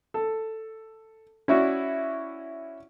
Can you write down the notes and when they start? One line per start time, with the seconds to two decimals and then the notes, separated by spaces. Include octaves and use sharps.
0.14 A4
1.48 C#4 E4 F#4 D5